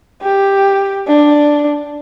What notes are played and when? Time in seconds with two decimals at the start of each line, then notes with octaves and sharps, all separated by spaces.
0.22 G4
1.08 D4